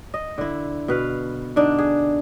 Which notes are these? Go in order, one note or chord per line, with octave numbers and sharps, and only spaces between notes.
D#5
D3 E4
B2 B4 F5
D3 D4 D#4
G#4